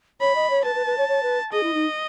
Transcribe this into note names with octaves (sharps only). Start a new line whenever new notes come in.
C#5 B5
D#5
C#5
B4 A5
B4
B4
C#5
C#5
B4
G#4 D#5
E4
D#4